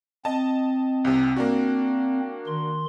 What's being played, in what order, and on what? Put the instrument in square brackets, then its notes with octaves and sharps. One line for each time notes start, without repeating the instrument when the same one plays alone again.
[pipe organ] C4 [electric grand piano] D#5 A5
[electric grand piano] C2 C3
A#3 D4 F#4
[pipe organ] D#3 C6